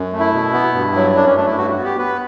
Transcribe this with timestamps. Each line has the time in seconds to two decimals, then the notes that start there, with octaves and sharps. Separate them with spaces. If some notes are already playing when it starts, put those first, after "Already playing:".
Already playing: F#2
0.13 A3
0.20 E4
0.34 B2
0.54 B3
0.74 G2
0.96 F#3
1.16 F#2 D4
1.26 C#4
1.37 A3 D4
1.47 E4
1.57 G2 F#4
1.70 F#4
1.78 B3
1.85 G4
1.99 B3 B4